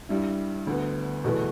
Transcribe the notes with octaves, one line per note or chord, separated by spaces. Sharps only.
G2 G3 E4
D2 D3 B3
E2 B2 A3 E4 B4